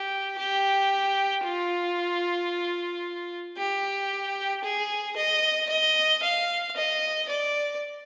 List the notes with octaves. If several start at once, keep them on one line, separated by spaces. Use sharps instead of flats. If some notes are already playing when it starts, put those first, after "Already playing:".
Already playing: G4
G4
F4
G4
G#4
D#5
D#5
F5
D#5
D5